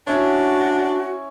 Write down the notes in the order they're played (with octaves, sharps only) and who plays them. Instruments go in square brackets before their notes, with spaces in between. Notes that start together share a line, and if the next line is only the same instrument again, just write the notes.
[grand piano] C#4 E4 C#5 [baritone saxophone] D4 [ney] F#4